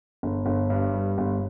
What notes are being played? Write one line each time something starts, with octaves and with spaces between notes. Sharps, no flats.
G1
G1
G2
G3
G1